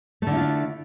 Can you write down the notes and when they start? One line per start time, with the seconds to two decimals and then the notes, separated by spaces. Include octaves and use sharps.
0.22 A3
0.27 D3
0.31 E4
0.36 F4
0.41 D4